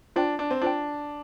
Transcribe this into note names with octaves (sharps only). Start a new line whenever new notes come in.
D4 F4 C5 G5
D4
C4
D4 F4 C5 G5